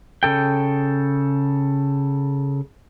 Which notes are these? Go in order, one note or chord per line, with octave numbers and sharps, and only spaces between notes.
C#3 A4 G5